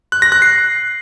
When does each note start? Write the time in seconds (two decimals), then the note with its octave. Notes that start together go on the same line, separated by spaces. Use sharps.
0.12 F#6
0.22 A#6
0.32 F#6
0.42 C7